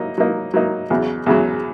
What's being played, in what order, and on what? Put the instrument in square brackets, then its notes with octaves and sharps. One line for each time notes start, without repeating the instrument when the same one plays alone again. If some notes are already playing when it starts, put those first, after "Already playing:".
Already playing: [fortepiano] F#3 A#3 D#4
F#3 A#3 D#4
F#3 A#3 D#4
E2 C#3 F#3
E2 C#3 F#3